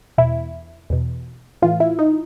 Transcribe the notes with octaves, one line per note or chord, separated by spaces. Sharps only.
E2 B2 E4
E2 B2
A2 E3 F4
E4
D#4